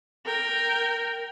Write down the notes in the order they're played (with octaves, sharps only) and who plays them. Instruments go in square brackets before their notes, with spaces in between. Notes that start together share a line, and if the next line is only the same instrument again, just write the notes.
[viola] A#4 G5